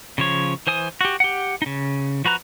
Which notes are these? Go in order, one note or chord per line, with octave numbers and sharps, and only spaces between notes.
C#3 F3 C#5
E3 C5 G#5 D#6
F#4 G4
G4 F#5
C#3 D#4
F3 F#4 B4 A#5 F#6